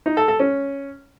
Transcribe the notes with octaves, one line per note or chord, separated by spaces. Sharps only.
D#4
A4
A4
C#4